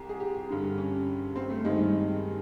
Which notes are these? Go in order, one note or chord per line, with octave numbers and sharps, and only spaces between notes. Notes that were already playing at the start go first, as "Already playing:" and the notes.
Already playing: C2 G4
G#4
G4
G2 D3
C#4
C4
A3
G2 D#3 G#3
G#3